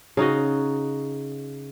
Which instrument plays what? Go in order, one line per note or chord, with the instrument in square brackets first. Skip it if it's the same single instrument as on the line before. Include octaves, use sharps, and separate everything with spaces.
[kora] C#3 D#4 F#4 D#5